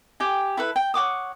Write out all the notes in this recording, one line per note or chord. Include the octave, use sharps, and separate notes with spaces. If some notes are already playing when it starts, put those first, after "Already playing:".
G4 G5 G#5
E4 A4 B4
G5
C#5 F#5 D6 D#6